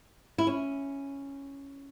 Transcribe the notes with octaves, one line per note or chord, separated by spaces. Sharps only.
E4
C#4